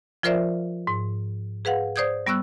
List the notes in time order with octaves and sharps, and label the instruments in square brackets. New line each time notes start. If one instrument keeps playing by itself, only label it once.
[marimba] F3 F4 A#4 C5 D5 E5
G#2
G#4 B4 F5 F#5
C5 D5 D#6 G6 G#6
G3 B3 C#6 E6 F#6